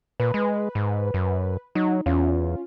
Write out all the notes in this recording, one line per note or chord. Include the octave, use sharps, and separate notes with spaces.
A#2 B4
G#3
G#2
F#2
F#3 D#4
E2 C#4 F4